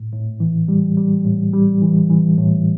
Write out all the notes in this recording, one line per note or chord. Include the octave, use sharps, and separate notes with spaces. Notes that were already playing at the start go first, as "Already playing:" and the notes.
Already playing: A2
A2
E3
G3
G3
A2
G3
E3
E3
A2